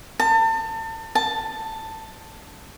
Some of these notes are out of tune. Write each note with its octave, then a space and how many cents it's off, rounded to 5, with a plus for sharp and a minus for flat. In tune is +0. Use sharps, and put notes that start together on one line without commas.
A5 +35
A5 +10